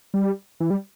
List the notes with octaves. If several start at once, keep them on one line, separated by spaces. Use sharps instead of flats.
G3
E3
G3